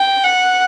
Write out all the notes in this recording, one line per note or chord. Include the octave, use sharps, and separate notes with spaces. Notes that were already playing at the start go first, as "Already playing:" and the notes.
Already playing: G5
F#5